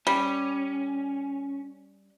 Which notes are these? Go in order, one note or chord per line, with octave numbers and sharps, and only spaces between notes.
G3 C#4